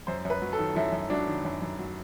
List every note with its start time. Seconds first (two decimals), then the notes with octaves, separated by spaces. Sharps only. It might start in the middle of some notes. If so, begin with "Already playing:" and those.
0.07 F#2 C5
0.25 F#2 B4
0.42 F#3
0.53 A4
0.59 D#3
0.75 F#2 E4
0.93 F#2
1.10 F#3 D4
1.28 D#3
1.45 F#2
1.62 F#2
1.79 F#3